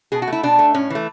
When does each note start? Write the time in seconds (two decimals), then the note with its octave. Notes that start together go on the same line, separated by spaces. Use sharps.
0.12 B2 G#4
0.22 F#4
0.27 A3
0.33 E4
0.43 B2 D4
0.59 A3
0.74 A2 C#4
0.90 E3 A3